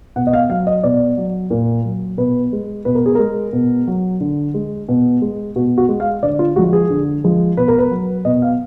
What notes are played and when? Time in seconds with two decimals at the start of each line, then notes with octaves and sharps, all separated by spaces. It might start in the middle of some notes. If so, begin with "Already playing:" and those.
0.16 B2 F#5
0.27 D#5
0.33 F5
0.50 F#3 F5
0.67 D#5
0.83 B2 D5
1.17 F#3
1.50 A#2
1.85 F#3
2.18 B2 B4
2.53 G#3
2.85 B2 B4
2.95 A#4
3.06 G#4
3.15 G#3 A#4
3.53 B2
3.87 F#3
4.21 D3
4.54 G#3
4.88 B2
5.22 G#3
5.56 B2 F#4
5.78 F#4
5.89 G#3
6.00 F5
6.23 D3 D5
6.39 F4
6.56 F3 G#3 F#4
6.73 G#4
6.90 D3
7.24 F3 G#3
7.57 B2 B4
7.68 A#4
7.78 B4
7.91 F#3
8.25 B2 D#5
8.42 F5